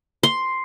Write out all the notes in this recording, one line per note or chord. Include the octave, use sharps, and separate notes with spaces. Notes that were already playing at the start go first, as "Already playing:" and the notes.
C6